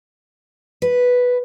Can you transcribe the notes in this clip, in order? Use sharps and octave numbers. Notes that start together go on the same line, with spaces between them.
B4